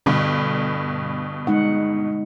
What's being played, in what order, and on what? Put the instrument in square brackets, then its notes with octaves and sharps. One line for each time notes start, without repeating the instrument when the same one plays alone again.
[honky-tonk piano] G2 B2 [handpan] D3
[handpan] G#3 D#4 F#5